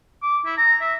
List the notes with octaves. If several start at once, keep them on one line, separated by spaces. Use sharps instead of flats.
D6
E4
A#5
E5